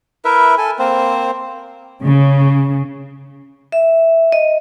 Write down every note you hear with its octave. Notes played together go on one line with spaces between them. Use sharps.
E4 A#4 B4 E5
A4 G#5
A#3 C4 C5
C#3
E5
D#5